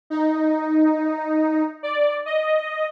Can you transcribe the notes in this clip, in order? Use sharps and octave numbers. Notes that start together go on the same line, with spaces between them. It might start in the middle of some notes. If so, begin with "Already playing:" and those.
D#4
D5
D#5